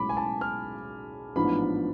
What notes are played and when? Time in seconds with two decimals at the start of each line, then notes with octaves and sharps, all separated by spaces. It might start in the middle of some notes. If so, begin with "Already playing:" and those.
Already playing: B1 A2 G#3 C#4 B5 D6
0.09 G#5
0.17 A5
0.41 F6
1.36 A1 G#2 F3 B3 D4 B5